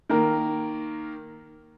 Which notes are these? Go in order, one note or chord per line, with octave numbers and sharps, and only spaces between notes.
D#3 A#3 A#4